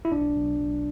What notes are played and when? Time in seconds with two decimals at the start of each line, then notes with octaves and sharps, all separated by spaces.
0.05 E4
0.12 B1 D4
0.36 B1
0.60 B1